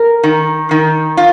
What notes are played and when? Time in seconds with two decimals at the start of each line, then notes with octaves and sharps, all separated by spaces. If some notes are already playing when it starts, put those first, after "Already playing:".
Already playing: A#4
0.24 D#3
0.71 D#3
1.17 F4